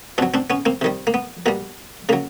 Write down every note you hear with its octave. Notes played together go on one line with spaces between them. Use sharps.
B2 F#3 C4 D4
C4 D4
B3 C#4
A#3 C4
C3 D#3 G3
A#3
B3
B2 G3 A#3
C#3 F#3 A#3